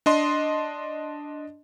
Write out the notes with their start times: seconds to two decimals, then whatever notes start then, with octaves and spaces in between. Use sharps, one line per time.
0.06 D4 D#5 C6